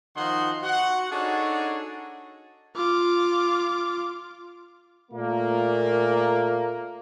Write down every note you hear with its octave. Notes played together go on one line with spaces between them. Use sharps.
D#3 F3 D#4 F#4 F#5 C6
F#4 F#5
D4 D#4 F#4 G#4 A4 C#5
F4 D6
A#2 A3 A#3